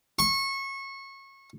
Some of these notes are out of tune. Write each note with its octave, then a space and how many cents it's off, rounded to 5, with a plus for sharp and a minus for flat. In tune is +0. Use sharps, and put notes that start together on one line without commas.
C#6 -25